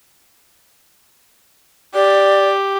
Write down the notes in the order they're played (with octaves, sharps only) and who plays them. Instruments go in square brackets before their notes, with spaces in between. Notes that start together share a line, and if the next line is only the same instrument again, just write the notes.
[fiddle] G4 [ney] D5